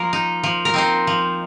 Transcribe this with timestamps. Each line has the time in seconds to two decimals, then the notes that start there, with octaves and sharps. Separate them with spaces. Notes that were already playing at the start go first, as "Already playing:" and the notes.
Already playing: F3 A#3 A#4
0.13 D#4
0.44 F3
0.65 A#4
0.74 C4 D#4 C5
1.07 F3